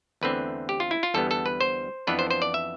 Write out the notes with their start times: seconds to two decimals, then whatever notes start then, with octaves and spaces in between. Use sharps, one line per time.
0.21 E2 D3 A3 C4 B4
0.69 G4
0.80 F4
0.91 E4
1.03 F4
1.14 E2 D3 G3 B3 A4
1.31 A4
1.46 B4
1.61 C5
2.07 F2 E3 B3 D4 B4
2.19 C5
2.31 C5
2.42 D5
2.54 E5